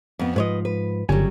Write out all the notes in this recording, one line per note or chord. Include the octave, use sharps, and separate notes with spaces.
F2 B3
G#2 F3 B4 C#5 D#5
B4
G1 C#3 F#3 G3 C#5 G#5